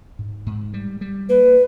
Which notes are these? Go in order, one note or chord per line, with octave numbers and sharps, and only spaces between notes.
G#2
G#2
G3
G3
A#3 B4